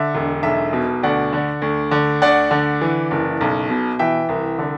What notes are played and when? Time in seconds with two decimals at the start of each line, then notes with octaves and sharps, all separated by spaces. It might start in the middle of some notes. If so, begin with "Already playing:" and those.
Already playing: D3 E5
0.14 E1
0.43 B1 E5
0.73 B2
1.03 D2 D5 F#5
1.33 D3
1.62 D2
1.91 D3
2.22 D2 D5 F#5
2.51 D3
2.81 E3
3.11 F#1
3.41 B1
3.70 B2
3.99 E3 E5 G5
4.29 C2
4.59 D3